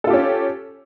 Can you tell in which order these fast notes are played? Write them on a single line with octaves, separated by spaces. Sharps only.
A4 F4 G4 C#4